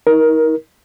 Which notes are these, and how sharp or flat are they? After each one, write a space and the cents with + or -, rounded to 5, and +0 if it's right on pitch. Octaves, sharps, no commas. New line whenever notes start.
D#4 +40 A#4 +20